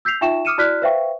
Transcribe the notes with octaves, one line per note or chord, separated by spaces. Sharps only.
E6 G6 B6 C7 F7
D#4 F4 E5 G5 C#6 E7
D6 D#6 F6 C#7 D#7 E7
E4 F#4 D5 F6 F#6 B6
B4 C5 E5 F5 G5 C#6